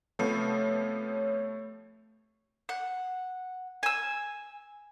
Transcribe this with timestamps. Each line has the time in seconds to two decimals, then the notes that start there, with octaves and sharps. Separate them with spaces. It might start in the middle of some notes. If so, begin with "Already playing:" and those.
0.19 C3 F3 A3 B3 C#5
2.69 F#5
3.83 G#5 E6